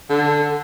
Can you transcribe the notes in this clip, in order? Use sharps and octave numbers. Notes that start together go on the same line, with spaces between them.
D3